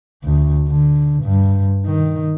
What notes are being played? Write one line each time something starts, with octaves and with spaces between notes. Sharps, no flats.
D2
D3
G2
D#3